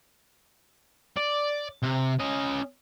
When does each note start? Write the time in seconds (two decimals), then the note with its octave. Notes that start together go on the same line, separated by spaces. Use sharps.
1.17 D5
1.83 C3
2.20 C#4 D#5